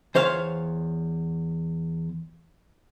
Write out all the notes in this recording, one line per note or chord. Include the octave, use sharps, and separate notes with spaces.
E2 C5 C#5 F5